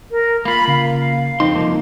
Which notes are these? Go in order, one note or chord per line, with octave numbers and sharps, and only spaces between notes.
A#4
A#3 F4 B5
C#3 F5
F2 C4 D#4 C6
C2 F3 A#3